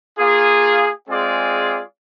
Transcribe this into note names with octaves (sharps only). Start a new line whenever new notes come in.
A#3 F4 G#4
G#3 C4 F4 G#4 D5